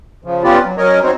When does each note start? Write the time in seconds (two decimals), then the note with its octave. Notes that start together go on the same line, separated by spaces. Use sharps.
0.24 C#3 F3
0.43 B3 C#4 F4 G4 B4 D5
0.65 F#3
0.78 F#3 C#4 A#4 C#5 D#5
1.03 C4 D#4 F#4 C5 C#5